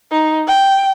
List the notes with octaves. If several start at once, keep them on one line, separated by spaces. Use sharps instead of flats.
D#4
G5